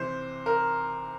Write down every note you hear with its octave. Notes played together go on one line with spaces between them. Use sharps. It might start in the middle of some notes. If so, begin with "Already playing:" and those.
Already playing: C3 E3 C5
A#4